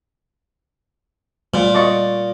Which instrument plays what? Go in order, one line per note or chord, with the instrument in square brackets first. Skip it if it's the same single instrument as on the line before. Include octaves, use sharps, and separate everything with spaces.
[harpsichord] A#2 [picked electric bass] G3 A3
[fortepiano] D5 D#5 C#6